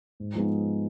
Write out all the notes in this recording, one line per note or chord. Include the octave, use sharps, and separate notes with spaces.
G#2
F3 G#3 B3 D#4